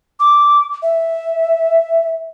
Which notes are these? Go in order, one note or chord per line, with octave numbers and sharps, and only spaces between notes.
D6
E5